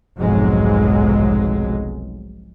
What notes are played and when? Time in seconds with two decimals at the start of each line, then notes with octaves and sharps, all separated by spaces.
0.19 F1 B1 F2 G#2 F#3 G#3